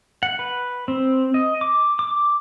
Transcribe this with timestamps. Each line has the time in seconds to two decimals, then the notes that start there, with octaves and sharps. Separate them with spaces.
0.23 F#5
0.39 B4
0.88 C4
1.34 D#5
1.61 D6
1.99 D6